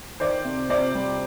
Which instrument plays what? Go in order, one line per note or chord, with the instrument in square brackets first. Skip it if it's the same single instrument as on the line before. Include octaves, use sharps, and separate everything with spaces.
[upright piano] D#3 C5 D5
C3
C3 C5 D5
G3